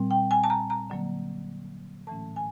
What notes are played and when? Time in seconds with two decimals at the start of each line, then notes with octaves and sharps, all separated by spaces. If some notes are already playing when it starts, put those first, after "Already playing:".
Already playing: A#2 G3 C4
0.11 G5
0.31 G#5
0.44 A5
0.50 A#5
0.70 A#5
0.90 D3 F#3 A#3
2.07 A2 E3 A3 C#4 A5
2.36 G#5